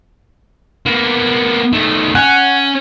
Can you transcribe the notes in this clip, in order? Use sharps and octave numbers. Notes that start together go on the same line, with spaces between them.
A#3 B3
D#3 A3
C#4 F#5